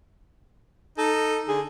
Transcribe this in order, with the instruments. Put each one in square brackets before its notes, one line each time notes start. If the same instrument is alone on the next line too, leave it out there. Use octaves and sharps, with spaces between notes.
[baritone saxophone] D#4 [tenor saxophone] A4
[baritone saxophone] D3 [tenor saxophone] G#4